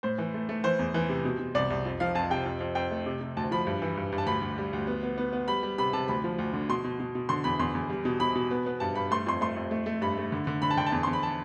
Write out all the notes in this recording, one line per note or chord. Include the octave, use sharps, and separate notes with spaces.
A2 C5
E3
A3
A3
E3 C5
E2
E3
C3
B2
B2
C2 D5
C2
F2
F3 F5
F2 A5
C3 G5
F2
F2
F2 G5
A3
C3
C3
D2 A5
F3 B5
G2
E3
G2
G2
A5
D2 B5
D2
G3
D2
B3
B3
B3
B3
G3 B5
G3
C3 B5
C3 A5
D2 B5
F3
D2
D3
B2 C6
B2
B2
B2
D3 C6
E2 B5
E2 C6
E2
G3
B2
B2 B5
B2
B3
B3
G2 A5
G2 B5
A3 C6
F2 C6
A3 C6
F2
A3
A3
G2 B5
A3
D3
D3
D3 B5
A5
D3 G5
A5
E2
E2 C6
B5
A5